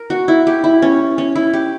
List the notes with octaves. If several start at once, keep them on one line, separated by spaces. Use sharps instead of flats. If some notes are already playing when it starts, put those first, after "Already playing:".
Already playing: A#4
F#4
E4
G4
E4
C#4
C#4
E4
G4